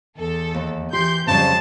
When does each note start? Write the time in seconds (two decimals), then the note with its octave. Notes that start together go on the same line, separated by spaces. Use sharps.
0.18 E2 A4
0.54 D#2
0.93 E3 G4 C6 G6
1.27 F2 C#3 F#3 G3 C5 A5